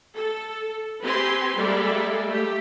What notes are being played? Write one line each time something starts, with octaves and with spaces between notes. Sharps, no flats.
A4
C4 G4 B4 G#5 C6
G3 G#3 A#3 A4 D5 E5
A3 G4